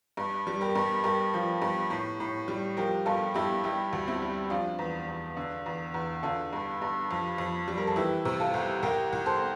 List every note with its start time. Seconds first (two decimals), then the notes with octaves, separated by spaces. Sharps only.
0.17 G2
0.47 G3
0.61 G4 A#4
0.75 G2
1.04 G2 G4 A#4
1.34 F3
1.62 G2
1.90 A2
2.20 A2
2.48 G3
2.77 F3 G4 A#4
3.06 G2 F4 A4
3.34 G2 E4 G4
3.64 G3 E4 G4
3.93 D2
4.08 C4 E4
4.22 G3
4.50 F3 D4 F4
4.79 E2
5.08 E2
5.37 D3
5.66 E2
5.94 E2
6.23 D3 F4 A4
6.53 G2
6.82 G2
7.11 F2
7.38 F2
7.68 G3
7.78 A#4
7.87 A4
7.96 E3 E4 G4
8.25 C3
8.40 F4 A4
8.54 C2
8.83 C2 G4 A#4
9.13 C2
9.26 A4 C5